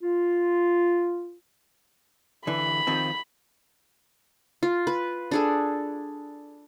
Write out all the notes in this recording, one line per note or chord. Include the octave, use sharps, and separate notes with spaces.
F4
D3 E3 B5
D#3 F3 C4
F4
B4
D4 G#4 A4